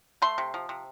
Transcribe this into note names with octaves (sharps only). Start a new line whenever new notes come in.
A3 C6
C3
F3
C3